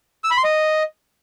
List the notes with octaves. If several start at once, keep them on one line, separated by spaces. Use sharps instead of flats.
E6
B5
C6
D#5